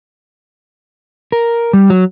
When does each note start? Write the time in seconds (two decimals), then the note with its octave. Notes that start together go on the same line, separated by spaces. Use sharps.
1.32 A#4
1.73 G3
1.90 F#3